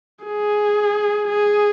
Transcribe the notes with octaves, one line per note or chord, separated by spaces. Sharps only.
G#4
G#4